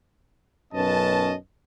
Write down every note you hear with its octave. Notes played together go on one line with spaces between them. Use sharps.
B1 F#2 C#4 B4 D#5 A5